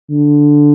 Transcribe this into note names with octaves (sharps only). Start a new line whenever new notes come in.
D3